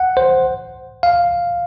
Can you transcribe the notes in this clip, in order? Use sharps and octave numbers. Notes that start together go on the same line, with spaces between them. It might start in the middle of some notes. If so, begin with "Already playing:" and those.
Already playing: F#5
C5
F5